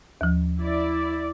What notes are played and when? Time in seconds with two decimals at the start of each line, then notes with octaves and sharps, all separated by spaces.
0.21 D#2 F3
0.59 E4 D5